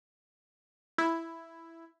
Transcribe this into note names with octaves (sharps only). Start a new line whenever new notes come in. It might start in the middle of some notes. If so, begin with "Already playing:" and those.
E4